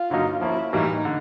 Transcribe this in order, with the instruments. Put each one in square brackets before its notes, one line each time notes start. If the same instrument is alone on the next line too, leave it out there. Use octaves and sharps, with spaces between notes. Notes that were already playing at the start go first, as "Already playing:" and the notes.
Already playing: [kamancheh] F4
[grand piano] G2 D3 F#3 A#3 D#4
[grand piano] F3 A#3 C#4 [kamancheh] E4
[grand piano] A2 E3 G3 A#3 [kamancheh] D#4
[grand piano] D3